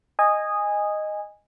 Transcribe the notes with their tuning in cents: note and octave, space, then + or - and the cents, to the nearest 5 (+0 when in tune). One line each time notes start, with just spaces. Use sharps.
D#5 -5 G#5 -15